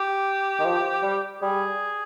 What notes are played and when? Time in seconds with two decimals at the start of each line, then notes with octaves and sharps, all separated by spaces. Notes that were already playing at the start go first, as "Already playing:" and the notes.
Already playing: G4
0.59 D#3
0.65 F3
1.03 G3
1.41 G3 G#4